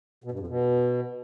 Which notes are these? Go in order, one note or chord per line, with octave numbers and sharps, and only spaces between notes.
B2
G2
F2
B2